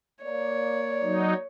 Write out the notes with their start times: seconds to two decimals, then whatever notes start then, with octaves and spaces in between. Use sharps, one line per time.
0.24 A#3 C#5 D5
1.02 F#3 D#4